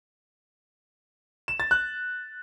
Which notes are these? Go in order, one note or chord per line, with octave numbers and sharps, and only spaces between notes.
E7
A6
F#6